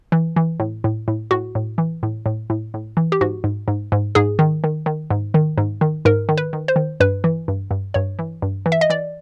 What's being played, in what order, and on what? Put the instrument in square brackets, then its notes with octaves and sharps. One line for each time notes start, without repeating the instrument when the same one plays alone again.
[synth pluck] E3
E3
A2
A2
A2
A2 F#4
A2
E3
A2
A2
A2
A2
E3
G4
G#2 F#4
G#2
G#2
G#2
G#2 G#4
D#3
D#3
D#3
G#2
D#3
G#2
D#3
G#2 A#4
D#3
B4
D#3
C5
D#3
G2 B4
E3
G2
G2
G2 C#5
E3
G2
E3
E5
D#5
E3 D5